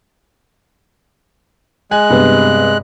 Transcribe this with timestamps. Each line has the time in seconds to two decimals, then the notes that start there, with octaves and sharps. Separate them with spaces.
1.91 G#3 G#5 F#6
2.10 G2 C3 B3